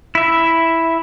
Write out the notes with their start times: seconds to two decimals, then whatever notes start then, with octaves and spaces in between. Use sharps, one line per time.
0.15 E4 E5